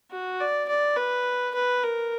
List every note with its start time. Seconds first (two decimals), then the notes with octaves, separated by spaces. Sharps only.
0.11 F#4
0.40 D5
0.68 D5
0.96 B4
1.54 B4
1.84 A#4